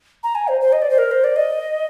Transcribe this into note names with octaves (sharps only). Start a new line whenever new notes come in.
A#5
G#5
C5
C5
D#5
D5
C5
A#4
C5
D5
D#5